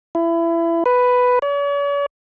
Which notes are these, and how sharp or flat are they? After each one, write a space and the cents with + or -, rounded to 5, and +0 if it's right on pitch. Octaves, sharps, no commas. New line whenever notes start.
E4 +25
B4 +5
C#5 +45